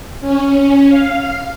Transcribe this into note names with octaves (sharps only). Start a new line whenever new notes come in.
C#4
F5